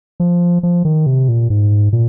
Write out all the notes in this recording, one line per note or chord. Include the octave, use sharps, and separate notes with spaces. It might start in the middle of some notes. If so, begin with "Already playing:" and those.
F3
F3
D#3
C3
A#2
G#2
A#2